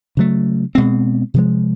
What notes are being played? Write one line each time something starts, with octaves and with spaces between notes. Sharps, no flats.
C#3 F#3 A3
B2 G#3 C4
C3 F3 G#3